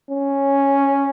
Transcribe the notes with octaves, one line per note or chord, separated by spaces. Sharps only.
C#4